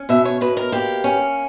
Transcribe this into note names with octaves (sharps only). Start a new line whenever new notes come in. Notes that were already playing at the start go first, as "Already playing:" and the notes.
Already playing: C#4
B2 E5
C#5
B2 B4
A#4
A#3 G4
C#4